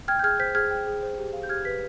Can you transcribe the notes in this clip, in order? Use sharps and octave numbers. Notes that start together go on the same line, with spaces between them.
G5 F6 G#6
G6
G#4 F6 G#6
C5 G6 B6
G#4 F6 G#6
G5
G#4
C5
G4
F5
G6
G4 F6 G#6
B4 B6